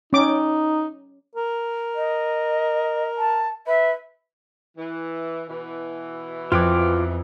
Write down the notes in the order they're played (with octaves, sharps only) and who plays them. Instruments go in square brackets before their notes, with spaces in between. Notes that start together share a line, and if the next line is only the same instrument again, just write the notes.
[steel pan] C#4 D6 [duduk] D#4
[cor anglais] A#4
[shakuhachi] D#5
A5
[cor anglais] B4 [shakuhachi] E5
[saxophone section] E3
B2 E3
[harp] F2 F#6 G#6 [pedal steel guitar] F4 G5 D6